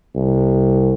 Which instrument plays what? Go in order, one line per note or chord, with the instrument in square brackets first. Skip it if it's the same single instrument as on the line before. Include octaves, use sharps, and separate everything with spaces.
[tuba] C2